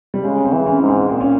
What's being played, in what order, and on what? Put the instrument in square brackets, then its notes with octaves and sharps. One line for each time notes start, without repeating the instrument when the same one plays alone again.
[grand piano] G3
[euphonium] C#3 [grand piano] G#3
[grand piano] C4
[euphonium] E3
[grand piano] C#4
[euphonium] G#2
[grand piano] C4
[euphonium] A#2 [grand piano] C4
[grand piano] C#4